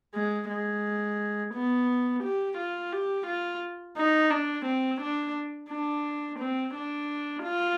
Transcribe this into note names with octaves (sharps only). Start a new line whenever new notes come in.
G#3
G#3
B3
G4
F4
G4
F4
D#4
D4
C4
D4
D4
C4
D4
F4